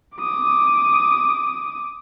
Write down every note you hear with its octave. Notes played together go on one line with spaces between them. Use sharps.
D6 D#6